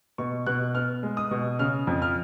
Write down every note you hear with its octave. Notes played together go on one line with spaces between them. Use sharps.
B2 C#6
B2 F#6
B3 F6
G#3
D#6
B2
C#3 F6
F2
F6